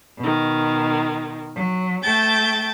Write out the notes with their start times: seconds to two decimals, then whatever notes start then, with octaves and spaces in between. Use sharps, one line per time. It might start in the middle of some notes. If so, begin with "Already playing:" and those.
0.19 B2 D#3
1.56 F#3
2.02 A3 G5 A5 G6 A6